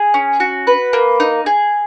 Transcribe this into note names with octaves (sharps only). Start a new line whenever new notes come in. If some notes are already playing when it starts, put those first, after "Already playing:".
Already playing: G#4
C#4
F#4
B4
A#3
D#4
G#4